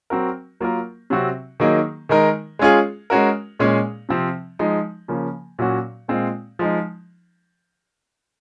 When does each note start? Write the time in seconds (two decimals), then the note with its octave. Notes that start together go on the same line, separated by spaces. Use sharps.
0.10 F#3 C4 F#4 A#4
0.60 F#3 A#3 F4 A#4
1.10 C3 F#3 C4 F#4
1.60 D#3 F#3 A#3 D#4 G#4
2.09 D#3 G#3 D#4 A#4
2.59 G#3 C#4 F4 G#4
3.10 G#3 C#4 F#4 A#4
3.59 A#2 G#3 C#4 G#4
4.09 C3 F3 C4
4.59 F3 G#3 D#4
5.08 C#3 F3 A#3 C#4
5.59 A#2 F#3 C#4 F#4
6.08 A#2 G#3 C4 F4
6.59 F3 G#3 D#4